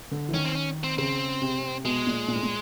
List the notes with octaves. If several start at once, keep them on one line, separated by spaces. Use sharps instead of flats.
D3
E3
D#3 C#4
C4
C#4
C4
C#3 C4
C3
B2 G#3
A#2
A#2
A2
A#2